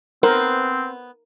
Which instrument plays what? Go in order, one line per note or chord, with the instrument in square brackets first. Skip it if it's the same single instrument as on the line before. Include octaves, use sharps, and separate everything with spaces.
[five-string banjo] B3 C5 [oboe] C4 [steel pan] A#4